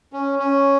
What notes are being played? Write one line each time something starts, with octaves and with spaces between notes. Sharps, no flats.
C#4
C#4